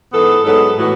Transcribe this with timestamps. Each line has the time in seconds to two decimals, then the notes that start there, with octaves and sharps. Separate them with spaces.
0.12 G#2 E3 B3 A4
0.44 G#2 F#3 B3 A4
0.77 A2 E3 B3 F#4